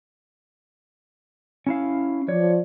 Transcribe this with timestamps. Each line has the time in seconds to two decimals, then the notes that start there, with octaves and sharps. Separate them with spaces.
1.67 C#4 E4 F5
2.29 F3 C#5 D5